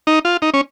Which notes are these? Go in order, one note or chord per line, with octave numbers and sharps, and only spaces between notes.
D#4
F4
D#4
C#4